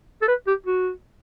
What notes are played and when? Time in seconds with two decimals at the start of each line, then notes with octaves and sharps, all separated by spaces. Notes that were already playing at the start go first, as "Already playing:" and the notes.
0.22 A4
0.28 B4
0.47 G4
0.67 F#4